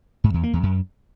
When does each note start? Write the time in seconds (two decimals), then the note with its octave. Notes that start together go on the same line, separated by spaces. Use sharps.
0.24 G#2
0.34 E2
0.43 A#3
0.53 E2
0.63 F#2